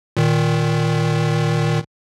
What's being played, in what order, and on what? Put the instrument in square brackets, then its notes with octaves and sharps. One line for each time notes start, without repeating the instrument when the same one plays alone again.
[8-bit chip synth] A#2 D#3